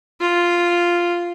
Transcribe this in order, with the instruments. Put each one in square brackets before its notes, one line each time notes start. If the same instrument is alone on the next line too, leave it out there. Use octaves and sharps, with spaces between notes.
[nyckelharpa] F4